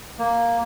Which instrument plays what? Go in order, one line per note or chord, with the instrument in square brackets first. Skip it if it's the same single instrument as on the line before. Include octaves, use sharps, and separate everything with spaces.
[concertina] A#3